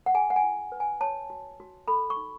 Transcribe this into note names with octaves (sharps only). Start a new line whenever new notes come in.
F#5
G#4 G#5
F#5
G#5
E4
B4
G#5
C#5 A5
F#4
F#4
A4 B5
C#6
D#4